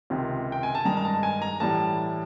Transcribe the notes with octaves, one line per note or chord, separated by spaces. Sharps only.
C#2 C3 D#3
G5
G#5
A5
G2 D#3 G#3 A#5
A#5
A5
G#5
A#5
A2 E3 G3 A5